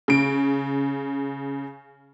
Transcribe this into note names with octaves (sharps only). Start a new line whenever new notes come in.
C#3 D7